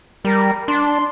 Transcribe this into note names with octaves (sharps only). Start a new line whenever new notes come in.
G3 A#4
D4 C6